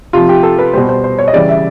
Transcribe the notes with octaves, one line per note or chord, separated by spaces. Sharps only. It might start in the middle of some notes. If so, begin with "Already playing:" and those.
C3 F3 F4
G4
A4
B4
B2 G3 C5
C5
C5
C#5
D#5
C#3 E3 G3 D5
E5